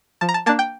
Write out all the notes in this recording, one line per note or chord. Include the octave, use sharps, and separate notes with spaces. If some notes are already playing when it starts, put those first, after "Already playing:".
F3 A5
A#5
A5
A#3 D4 A5
G5